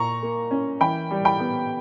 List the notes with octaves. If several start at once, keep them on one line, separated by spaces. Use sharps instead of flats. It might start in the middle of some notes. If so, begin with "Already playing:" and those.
Already playing: A#2 A#5 C#6
A#3
C#4
E3 G5 B5
G3
G5 B5
B3